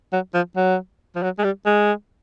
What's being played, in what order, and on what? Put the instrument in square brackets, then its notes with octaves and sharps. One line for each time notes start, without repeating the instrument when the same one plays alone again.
[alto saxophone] F#3
F3
F#3
F3
F#3
G#3
G3
G#3